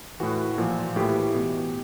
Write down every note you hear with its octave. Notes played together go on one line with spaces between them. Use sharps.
A2 E3 F#4
A#2 F3
A2 E3 G4
B2